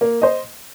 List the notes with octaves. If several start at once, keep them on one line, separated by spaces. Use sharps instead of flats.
A#3
C5 D#5